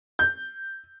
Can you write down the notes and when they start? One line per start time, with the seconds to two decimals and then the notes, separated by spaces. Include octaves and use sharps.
0.19 G6